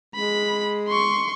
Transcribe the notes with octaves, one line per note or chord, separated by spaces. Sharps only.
G#3 B5
C6 C#6